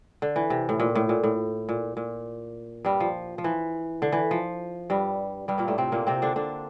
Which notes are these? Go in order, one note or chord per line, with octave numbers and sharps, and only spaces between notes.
D3
E3
C3
A2
A#2
A2
A#2
A2
A#2
A#2
G2 G3
F3
F3
E3
D3
E3
F3
G2 G3
G2 G3
A#2 A#3
A2 A3
C3 C4
A#2 A#3
C3 C4
D3 D4
D3 D4